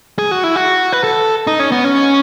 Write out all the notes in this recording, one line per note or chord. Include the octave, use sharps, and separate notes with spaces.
G#4
F#4
E4
F#4
B4
A4
D#4
C#4
B3
C#4